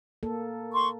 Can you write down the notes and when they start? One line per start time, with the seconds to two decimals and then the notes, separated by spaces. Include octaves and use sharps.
0.23 A#3 A4
0.73 C6 C#6